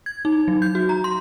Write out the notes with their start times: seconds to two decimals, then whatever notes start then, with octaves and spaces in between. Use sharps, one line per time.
0.06 G#6
0.25 D#4
0.48 F#3
0.62 G6
0.75 F#4
0.89 A#5
1.04 C6